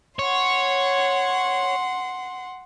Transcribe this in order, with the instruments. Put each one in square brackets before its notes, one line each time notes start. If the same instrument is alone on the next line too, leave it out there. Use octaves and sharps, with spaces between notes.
[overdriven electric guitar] C#5 [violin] F#5 C6